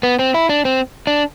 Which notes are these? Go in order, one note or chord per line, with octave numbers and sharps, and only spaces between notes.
B3
C4
E4
D4
C4
D4